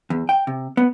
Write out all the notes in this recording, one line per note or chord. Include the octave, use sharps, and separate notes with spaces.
E2
G5
C3
B3